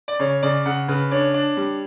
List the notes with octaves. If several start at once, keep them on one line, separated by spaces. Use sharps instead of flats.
D5
C#3 C#5
C#3 D5
C#3 F#5
C#3 B4
D4 C#5
D4
G3